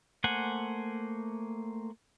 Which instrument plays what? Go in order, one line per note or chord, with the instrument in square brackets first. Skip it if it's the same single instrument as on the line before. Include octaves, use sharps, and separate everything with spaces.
[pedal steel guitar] A3 A#3 C5 F#5 G#5